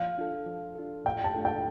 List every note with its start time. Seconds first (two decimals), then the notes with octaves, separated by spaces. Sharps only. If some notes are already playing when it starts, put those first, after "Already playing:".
Already playing: F3 F5
0.18 D4 F4 A4
0.47 F3
0.75 D4 F4 A4
1.05 A2 G5
1.24 A5
1.34 A3 D4 F4 A4
1.45 G5